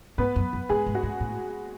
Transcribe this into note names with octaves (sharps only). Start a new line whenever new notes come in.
G#2 B3 B4
F#2
F#2
G#2 G#3 G#4
G#2
F#4
G#2
A2